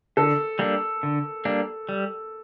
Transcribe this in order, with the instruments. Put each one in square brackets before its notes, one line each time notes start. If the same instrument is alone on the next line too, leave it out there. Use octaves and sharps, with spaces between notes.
[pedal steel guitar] D3 [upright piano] A4
[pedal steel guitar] G3 A#3 D4
D3
G3 A#3 D4
G3